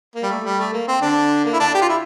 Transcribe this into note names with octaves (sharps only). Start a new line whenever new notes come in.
A#3
G3
A3
G3
A3
A#3
C4
D3 D4
A#3
E4
D3 D4
G4
F4
E4